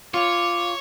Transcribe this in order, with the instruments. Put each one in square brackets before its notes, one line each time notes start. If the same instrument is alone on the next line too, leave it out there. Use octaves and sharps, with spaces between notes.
[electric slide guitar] F4 [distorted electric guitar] C#5 [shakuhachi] D6